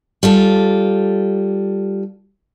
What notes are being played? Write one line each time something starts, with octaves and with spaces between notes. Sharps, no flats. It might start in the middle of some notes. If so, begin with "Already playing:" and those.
G3 F4 A4